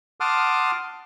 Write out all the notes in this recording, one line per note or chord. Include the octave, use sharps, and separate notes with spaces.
F#5 A5 C6 D6 D#6 F6